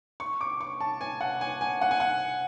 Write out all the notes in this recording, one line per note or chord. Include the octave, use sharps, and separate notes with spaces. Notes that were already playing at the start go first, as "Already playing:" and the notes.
C#6
D6
C#6
A5
G#5
F#5
G#5
G#5
F#5
G#5
F#5